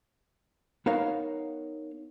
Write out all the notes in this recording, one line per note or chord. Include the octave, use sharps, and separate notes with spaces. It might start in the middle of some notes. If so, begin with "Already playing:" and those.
B3 D#4 A#4 C#5 F5